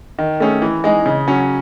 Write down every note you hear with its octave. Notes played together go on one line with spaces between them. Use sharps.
D#3
A3 C#4 G#4
E3
G#3 D#4 G#4
C#3
F#3 C#4